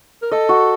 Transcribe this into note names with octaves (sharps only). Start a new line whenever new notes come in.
A#4
A4 D#5
F#4